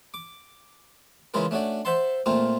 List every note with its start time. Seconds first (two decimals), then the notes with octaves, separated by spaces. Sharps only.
0.14 D6
1.34 C#3 E3 G#3 E4 F4 A#4
1.51 A3 C#4 D4 F#4 D5
1.85 C5 E5 F#5 A5 C6
2.26 A#2 A3 C4 F4 A#5